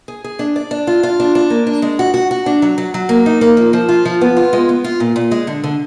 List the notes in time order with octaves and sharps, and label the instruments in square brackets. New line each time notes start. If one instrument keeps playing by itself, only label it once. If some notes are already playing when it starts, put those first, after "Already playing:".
[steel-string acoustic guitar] G#4
G#4
D4
D5
D4
F4
F4
D4
D4
A#3
D4
G#3
F#4
F#4
F#4
D4
F#3
F#3
F#3
A#3
D#4
A#3
F3
F3
F4
F3
B3
F4
G#3
B3
F4
A#2
A#2
G#3
D3
D3